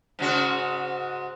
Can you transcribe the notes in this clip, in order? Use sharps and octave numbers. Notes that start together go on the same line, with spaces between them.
G#2 C#3 F#4